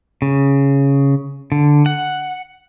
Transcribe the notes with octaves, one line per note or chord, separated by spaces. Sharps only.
C#3
D3
F#5